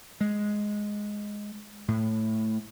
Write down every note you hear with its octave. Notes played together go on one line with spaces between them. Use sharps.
G#3
A2